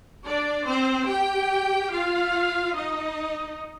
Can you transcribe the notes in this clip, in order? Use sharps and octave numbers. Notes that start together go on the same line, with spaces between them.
D4 D5
C4 C5
G4 G5
F4 F5
D#4 D#5